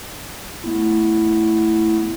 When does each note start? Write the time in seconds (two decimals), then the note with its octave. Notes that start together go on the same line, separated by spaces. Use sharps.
0.64 A3 B3 E4